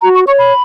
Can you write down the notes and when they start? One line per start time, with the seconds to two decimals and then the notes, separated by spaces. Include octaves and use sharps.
0.02 F#4 A#5
0.14 C#6
0.27 C#5 C#6
0.39 B5